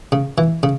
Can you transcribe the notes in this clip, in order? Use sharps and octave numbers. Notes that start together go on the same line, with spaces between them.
C#3
E3
C#3